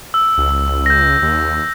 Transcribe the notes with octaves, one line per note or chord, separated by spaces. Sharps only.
E6
C#2
G6 A#6
D#2